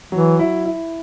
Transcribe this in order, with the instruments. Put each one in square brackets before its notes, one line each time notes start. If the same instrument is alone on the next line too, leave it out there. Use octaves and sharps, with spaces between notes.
[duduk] E3 [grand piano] F#3
[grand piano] E4
E4